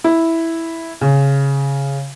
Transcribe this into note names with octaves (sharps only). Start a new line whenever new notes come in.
E4
C#3